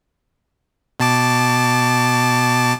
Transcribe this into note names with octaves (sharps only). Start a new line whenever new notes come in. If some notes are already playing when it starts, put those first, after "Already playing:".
B2 A5 D6